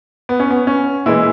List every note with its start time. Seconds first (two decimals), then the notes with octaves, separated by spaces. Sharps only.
0.29 B3
0.40 C#4
0.50 B3
0.67 C#4
1.06 A#2 E3 G#3 E4